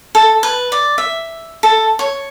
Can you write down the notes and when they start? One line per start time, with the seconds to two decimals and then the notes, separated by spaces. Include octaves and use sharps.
0.15 A4
0.43 B4
0.72 D5
0.98 E5
1.63 A4
1.99 C#5